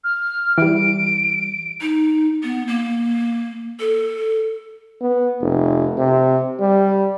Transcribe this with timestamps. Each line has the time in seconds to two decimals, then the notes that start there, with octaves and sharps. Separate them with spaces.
0.04 F6
0.58 E3 G3 D7
1.81 D#4
2.43 B3
2.67 A#3
3.80 A4
5.01 B3
5.41 F1
5.98 C3
6.61 G3